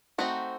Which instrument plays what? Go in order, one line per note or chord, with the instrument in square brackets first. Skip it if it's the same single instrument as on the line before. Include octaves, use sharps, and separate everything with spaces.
[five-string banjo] A3 C4 D#4 F#4